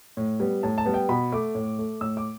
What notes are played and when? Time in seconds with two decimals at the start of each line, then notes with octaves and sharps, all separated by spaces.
0.17 A2
0.40 G3 B3
0.63 A2 A5
0.78 A5
0.86 G3 B3
0.94 G5
1.09 B2 B5
1.32 A3 D6
1.55 A2
1.79 A3
2.01 A2 E6
2.17 D6